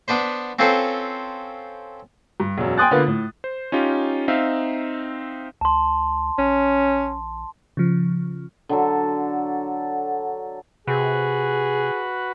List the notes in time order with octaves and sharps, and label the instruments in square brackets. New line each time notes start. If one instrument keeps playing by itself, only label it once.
[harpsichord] B3 D4 B4 C5
C4 C#4 F4 A4 B4 C5
[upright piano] G2
E1 F#2
G5 G#5 C6 D#6 F#6 A6
D3 A#3 B3 F4 B4
A2
[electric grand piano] C5
C#4 D#4 F4 G4
C4 D#4 E5 F5
[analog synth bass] C#2 [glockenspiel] A5 C6
[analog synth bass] A#1 [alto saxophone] C#4
[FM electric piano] C#3 F3
[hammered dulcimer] D3 F#3 A4
[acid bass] C3 [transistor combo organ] F#4 B4 [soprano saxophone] G#4